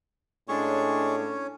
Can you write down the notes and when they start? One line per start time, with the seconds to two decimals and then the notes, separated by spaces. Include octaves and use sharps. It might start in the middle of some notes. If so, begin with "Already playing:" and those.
0.49 A2 G#3 C#4 D4 G#4 C#5 C#6